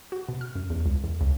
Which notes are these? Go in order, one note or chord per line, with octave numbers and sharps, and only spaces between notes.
F#4
B2
F6
F#2
E2
C#2
E2
C#2